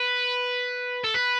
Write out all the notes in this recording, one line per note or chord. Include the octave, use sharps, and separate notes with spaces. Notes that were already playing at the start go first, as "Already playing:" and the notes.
Already playing: B4
A4
B4